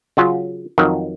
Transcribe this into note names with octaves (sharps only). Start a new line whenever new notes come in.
C#3 F#3 C#4 F4
F2 D#3 F#3